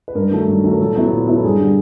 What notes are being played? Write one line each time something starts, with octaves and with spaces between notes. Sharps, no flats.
B4
G2 A#4
D#3 F#3 A3
G2
D#3 F#3 A3
A#4
A#2 A4
F#3 B3 E4
A#2
F#3 B3 E4
A4
G2 G#4
D3 G3